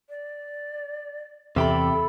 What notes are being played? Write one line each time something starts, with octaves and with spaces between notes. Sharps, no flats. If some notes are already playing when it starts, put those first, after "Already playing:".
D5
E2 C3 G4 A4 E5 B5